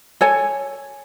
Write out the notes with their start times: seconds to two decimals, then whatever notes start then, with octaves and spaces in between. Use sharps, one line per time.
0.21 A4 C#5 G#5